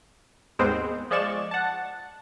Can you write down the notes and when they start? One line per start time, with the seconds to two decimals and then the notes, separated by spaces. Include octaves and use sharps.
0.59 D#2 G#2 G#3 B3 C4 C5
1.11 F3 G#3 D5 C#6 E7
1.51 F#5 A5